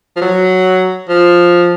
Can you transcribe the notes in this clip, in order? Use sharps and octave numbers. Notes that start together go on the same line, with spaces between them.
F3
F#3
F3